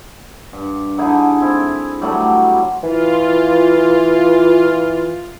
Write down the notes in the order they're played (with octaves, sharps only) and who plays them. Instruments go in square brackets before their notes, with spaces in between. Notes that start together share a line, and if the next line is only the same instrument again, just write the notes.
[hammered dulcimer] G2
D3 D#4 E4 G#4
C4 E4
F#3 G3 A3
[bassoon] E3 [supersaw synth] F4